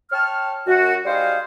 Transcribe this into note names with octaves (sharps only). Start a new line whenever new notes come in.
C#5 G5 A5 F6
F#2 F#4
G3 D#4 G#4 C5 F5